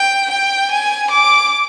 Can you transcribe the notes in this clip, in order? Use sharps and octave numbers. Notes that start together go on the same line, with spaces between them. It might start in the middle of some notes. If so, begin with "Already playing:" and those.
Already playing: G5
G5
G#5
D6